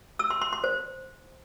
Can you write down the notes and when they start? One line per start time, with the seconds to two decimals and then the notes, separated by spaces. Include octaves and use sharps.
0.19 E6
0.30 C6
0.42 C6
0.53 C6
0.64 C5